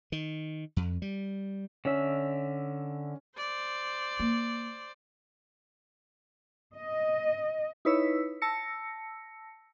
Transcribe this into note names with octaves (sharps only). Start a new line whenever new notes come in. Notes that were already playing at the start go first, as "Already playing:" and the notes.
D#3
F2
G3
D3 C#4 E5
C5 D5
A#3
D#5
D#4 E4 B4 C#5 E6 B6
A5 E6 A#6 C#7